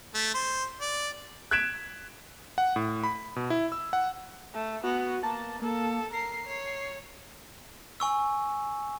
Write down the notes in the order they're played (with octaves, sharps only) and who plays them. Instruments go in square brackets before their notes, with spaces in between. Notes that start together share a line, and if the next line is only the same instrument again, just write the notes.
[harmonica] A3
C5
D5
[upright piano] F#6 G#6 B6 D7 E7
[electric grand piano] F#5
A2
B5
B2
E4
E6
F#5
[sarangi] A3
[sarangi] B3 [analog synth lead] F#4
[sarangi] A#3 [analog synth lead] A5
[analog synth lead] A#3 [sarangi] A4
[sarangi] A#4 [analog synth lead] C7
[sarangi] C#5
[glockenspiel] G#5 C#6 E6